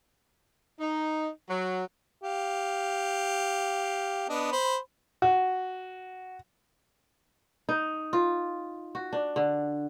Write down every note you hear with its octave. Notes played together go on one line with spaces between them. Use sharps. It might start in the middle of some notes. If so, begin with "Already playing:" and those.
D#4
F#3
G4 F5
B3 D4 D#5
C5 B5
F#4
D#4
F4
F#4
D4
D3